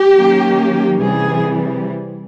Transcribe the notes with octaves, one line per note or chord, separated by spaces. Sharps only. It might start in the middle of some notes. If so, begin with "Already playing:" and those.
Already playing: G4
D#3 F#3 A#3 C#4
C3 E3 G3 G#4